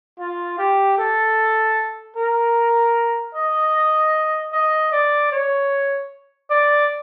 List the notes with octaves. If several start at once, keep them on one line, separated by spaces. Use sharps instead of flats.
F4
G4
A4
A#4
D#5
D#5
D5
C#5
D5